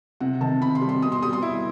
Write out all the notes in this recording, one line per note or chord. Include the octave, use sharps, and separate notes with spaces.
C3 F#5
D#3 A5
C3 B5
C6
G3
C6
B2 D#6
C6
G3 D#6
C6
E4